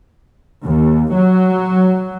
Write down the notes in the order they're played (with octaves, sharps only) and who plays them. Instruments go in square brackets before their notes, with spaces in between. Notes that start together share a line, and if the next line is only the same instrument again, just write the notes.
[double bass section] D#2
F#3